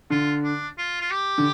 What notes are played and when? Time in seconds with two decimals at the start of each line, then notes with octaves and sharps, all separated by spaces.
0.10 D3 F4
0.44 D4
0.78 F4
1.01 F4
1.11 G4
1.38 D3